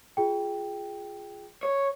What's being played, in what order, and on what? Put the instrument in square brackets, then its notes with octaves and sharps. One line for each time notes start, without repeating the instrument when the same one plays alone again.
[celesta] F4 G#4 G5
[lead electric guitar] C#5